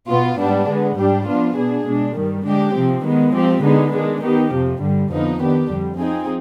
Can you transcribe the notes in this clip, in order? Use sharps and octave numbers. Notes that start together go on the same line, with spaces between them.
B2 B3 F4
G#2 G3 B3 D4
D3 G#3 B3
G#2 G3 D4 G4
F3 B3 D4 F4
B2 B3 D4 G#4
B2 G#3 D4
G2 D#3 G3
D3 G#3 D4 G4
C3 F3 C4
D#3 G#3 B3
F3 C4 G4
D3 G#3 B3 D#4
D#3 G#3 D4
D#3 B3 D#4 G4
F2 C3 F3
G2 D3 G3
F2 D3 F3 B3 D#4
D#3 B3 D4 G4
F2 D3 G3
F3 C4 D#4 G#4